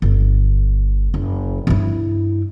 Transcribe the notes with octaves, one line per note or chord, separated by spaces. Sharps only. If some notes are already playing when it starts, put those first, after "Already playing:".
G1
F#1
G2 E4